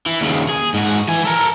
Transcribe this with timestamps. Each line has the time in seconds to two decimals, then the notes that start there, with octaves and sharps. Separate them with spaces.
0.06 E3
0.21 D#2 C#3
0.49 G#4
0.74 G#2 F#4
1.08 E3 G#5
1.25 A4 A#4